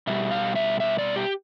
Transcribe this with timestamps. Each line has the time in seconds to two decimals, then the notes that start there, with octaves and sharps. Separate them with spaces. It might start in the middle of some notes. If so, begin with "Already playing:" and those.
0.07 B2 G3 E5
0.31 F5
0.55 E5
0.80 E5
0.98 D5
1.16 G4